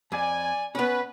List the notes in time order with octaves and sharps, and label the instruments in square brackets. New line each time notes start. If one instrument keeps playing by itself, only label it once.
[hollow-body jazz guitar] F2 [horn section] D5 G#5
[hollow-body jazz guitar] B3 C#4 [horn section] B4